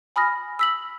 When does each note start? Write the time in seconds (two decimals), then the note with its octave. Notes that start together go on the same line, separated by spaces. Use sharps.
0.16 G#5 B5 D#6 F6 A#6
0.59 E6 B6 F#7